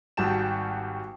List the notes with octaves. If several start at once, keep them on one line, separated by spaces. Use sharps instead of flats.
G#1 G3 F#4 G5 A5 E7